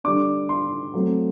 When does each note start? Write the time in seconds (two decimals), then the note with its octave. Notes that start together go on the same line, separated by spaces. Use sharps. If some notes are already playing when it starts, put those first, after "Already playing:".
0.04 D3 G3 D4 D6
0.49 C6
0.94 F#3 A3 C4